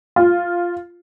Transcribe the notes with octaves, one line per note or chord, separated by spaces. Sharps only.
F4